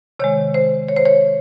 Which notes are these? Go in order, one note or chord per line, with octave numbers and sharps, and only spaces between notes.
C3 D#3 G#3 C#5
C5
C#5
C5
C#5